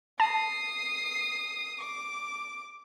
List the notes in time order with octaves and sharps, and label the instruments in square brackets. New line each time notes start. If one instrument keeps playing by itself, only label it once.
[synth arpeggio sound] A5 [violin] D#6 C7
[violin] D6